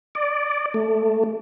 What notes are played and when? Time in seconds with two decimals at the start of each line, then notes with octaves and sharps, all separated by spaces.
0.15 D5
0.74 A3